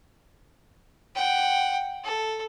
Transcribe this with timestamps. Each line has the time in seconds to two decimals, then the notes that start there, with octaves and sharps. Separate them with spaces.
1.15 F#5 G5
2.04 A4